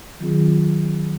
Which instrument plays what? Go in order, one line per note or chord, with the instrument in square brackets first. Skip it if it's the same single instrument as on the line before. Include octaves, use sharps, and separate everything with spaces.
[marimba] D#3 F#3 C4 F4 G#4